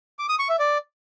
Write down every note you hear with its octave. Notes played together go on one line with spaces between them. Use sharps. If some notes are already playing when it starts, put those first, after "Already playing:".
D6
D#6
C#6
E5
D5